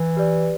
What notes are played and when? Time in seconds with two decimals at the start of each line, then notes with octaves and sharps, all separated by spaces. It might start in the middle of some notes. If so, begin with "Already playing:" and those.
Already playing: E3
0.17 G4 B4 D5